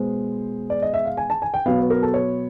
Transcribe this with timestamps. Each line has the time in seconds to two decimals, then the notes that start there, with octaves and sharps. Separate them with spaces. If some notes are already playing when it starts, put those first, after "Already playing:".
Already playing: B2 G#3 B3 C5
0.70 D5
0.82 D#5
0.94 E5
1.05 F5
1.17 G#5
1.30 A5
1.42 G#5
1.54 G5
1.66 B2 F#3 B3 F5
1.78 B4
1.90 A#4
2.03 A4
2.14 C#5